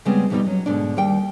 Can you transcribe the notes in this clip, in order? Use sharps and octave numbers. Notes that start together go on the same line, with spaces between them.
C#3 G3 G#3 B3 C4
F2 B2 G3 D4 D#4
F#3 C#4
G#2 B2 D3 D4
D#2 G3 G5